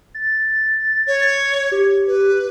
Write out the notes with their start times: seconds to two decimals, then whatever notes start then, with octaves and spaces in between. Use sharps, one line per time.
0.14 A6
1.07 C#5
1.72 G4
2.07 B4